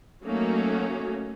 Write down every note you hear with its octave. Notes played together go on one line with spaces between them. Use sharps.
F#3 A3 A#3 C#4 D#4 F#4